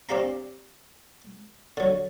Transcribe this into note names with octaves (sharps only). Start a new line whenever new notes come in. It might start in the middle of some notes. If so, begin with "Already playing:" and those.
C4 D4 G4 F5 A#5
D3 F#3